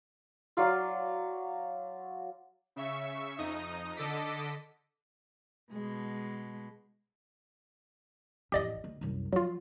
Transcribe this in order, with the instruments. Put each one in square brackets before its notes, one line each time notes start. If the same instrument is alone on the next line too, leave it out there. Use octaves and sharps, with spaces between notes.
[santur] F#3 D5 F5 C6
[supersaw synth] C#3 E5 C#6
F2 D#4 D#6
D3 A4 D#5 D6 B6
[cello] B2 G#3
[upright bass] A1 F2 [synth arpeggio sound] G4 D5 D#5
[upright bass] D2
C2 F#2
[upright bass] F3 [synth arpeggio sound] F#3 F4